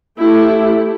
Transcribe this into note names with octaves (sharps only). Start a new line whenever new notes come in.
A3 E4 G4 A4